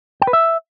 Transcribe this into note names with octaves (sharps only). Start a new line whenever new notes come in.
G5
B4
E5